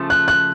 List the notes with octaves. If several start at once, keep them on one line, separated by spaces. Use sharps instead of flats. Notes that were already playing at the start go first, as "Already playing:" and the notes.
Already playing: C#3 F3 A3
F#6
F#6